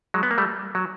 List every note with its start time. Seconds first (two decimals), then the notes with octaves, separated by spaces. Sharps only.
0.14 F#3 G#3
0.23 B3
0.31 A#3
0.38 G3 A3
0.75 F#3